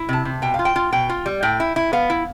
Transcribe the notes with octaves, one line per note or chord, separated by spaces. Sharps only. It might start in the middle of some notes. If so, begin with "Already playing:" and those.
Already playing: E4
C3 A5
C3
B2 G5
F5
F4
G5
F4
B2 G5
F4
G3
A2 G5
E4
E4
B3 F5
E4